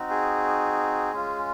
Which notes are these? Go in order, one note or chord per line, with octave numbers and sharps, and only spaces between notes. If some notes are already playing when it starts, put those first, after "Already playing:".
Already playing: C4 D#4 F#4
G#4
G#3 C#4 F4